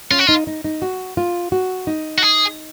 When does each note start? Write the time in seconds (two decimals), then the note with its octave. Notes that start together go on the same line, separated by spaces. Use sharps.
0.11 C#4 F4
0.19 F#4
0.27 D#4 F4
0.47 D#4
0.64 D#4
0.82 F#4
1.17 F4
1.52 F#4
1.87 D#4
2.18 F#4
2.23 G#4